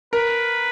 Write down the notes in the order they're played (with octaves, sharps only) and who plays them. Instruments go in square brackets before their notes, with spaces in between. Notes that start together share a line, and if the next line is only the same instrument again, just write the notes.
[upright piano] A#4 [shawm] B4